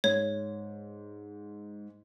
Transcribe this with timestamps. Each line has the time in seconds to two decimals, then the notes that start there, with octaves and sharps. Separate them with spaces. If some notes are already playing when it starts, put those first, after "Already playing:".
0.04 G#2 C#5